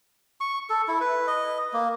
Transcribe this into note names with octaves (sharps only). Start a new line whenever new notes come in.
C#6
A4
E4
B4
D#5
A#3